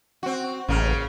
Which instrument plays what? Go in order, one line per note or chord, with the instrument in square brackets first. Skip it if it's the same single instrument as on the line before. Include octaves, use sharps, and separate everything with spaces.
[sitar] C4 F#4
[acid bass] A1 [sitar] C#3 A#3